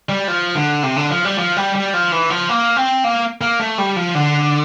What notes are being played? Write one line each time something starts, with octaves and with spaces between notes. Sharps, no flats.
G3
F3
D3
C3
D3
F3
G3
F3
G3
G3
F3
E3
F3
A#3
C4
A#3
A#3
A3
G3
F3
D3